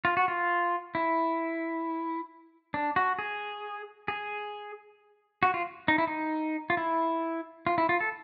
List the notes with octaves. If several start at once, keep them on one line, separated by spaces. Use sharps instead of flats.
F4
F#4
F4
E4
D4
F#4
G#4
G#4
F#4
F4
D#4
E4
D#4
F4
E4
F4
E4
F4
A4